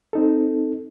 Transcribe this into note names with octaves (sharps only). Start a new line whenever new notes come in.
C4 D#4 A4